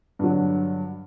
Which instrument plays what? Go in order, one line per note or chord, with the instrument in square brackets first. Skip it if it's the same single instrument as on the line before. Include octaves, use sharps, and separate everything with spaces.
[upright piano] G2 D3 F#3